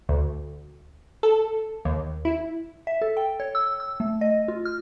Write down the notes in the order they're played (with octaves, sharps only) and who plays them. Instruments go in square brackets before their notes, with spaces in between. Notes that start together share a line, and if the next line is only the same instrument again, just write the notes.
[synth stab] D2
A4
D#2
E4
[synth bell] E5
A4
G5
C#5
E6
E6
A3
D#5
F4
F6